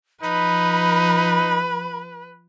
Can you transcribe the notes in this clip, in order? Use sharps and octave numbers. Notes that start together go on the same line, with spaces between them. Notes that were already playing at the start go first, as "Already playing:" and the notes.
F3 D#4 B4 B5